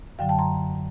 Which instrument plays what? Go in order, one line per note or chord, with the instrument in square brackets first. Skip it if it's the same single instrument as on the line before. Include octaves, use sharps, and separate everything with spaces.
[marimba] F#2 D3 F#3 F5 G5
G5 A5
A#5 C6